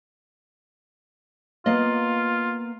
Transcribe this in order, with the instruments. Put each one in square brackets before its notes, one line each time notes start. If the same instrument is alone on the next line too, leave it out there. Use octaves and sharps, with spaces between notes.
[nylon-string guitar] A#3 B3 D#5 [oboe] F4